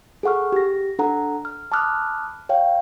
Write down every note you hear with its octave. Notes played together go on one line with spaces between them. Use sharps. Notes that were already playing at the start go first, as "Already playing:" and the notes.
G#4 A4 F#5 C#6 F6
G4 A#6
D4 A4 F#5 A#5
F6
A5 B5 D6 D#6 F6 F#6
C#5 F5 G5